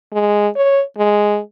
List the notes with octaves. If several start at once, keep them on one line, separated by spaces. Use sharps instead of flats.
G#3
C#5
G#3